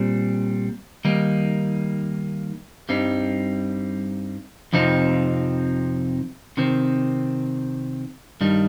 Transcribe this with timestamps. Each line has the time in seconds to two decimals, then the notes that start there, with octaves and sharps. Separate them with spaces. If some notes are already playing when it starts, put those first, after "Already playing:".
Already playing: A#2 G3 C4
1.05 D#3 G3 A#3 D#4
2.89 G2 G3 C4 D#4
4.73 F2 C3 F3 C4 D#4
6.57 C3 D#3 C4
8.41 G2 D#3 G3 D#4